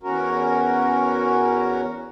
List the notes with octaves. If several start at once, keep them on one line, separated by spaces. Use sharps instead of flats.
E2 C#4 F#4 A#4